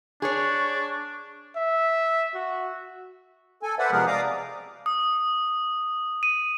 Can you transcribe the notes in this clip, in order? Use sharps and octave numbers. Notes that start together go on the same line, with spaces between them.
D4 G#4 C#5 C#6
E5
F#4
A4 G#5
B4 C5 D5 E5 F#5
C3 F3 G#3 B3 G#4 A#4
D5 F5 A#5 D6 D#6
D#6
D#7